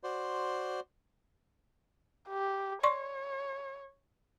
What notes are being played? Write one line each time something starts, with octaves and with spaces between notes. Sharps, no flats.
F#4 C5 D5 C6
G4
C#5 D5 C6 C#6